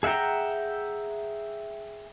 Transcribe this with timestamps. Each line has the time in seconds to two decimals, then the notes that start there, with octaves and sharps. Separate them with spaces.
0.03 G#4 E5 F#5 G5 A#5